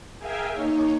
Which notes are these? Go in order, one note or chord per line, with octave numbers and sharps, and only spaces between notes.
G#4 A#4 E5 F5 G5 G#5
A#3 D#4 C#5